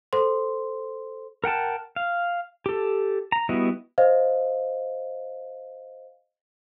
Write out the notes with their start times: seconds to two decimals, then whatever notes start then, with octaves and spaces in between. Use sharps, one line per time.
0.13 A4 C5 C6
1.44 A#4 F#5 G5 A5
1.96 F5
2.66 G4 A4
3.32 A#5
3.49 G3 B3 E4 F#4 D#5
3.98 C5 D#5 F5